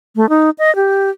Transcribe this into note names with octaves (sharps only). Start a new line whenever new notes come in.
A3
D#4
D#5
G4